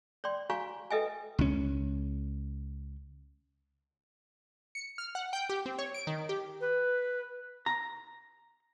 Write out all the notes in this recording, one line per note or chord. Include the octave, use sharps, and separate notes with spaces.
C#5 D5 G5 C6
F#4 C#5 F5 G#5 A#5 C#6
A4 B4 D#5 E5 G5 G#5
C#2 C#4
C#7
F6
F#5
G5
G4
C4
C#5
D7
D#3
G4
B4
A#5